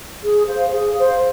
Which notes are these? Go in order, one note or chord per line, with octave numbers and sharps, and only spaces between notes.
G#4
C5 F5
G#4
C5 F5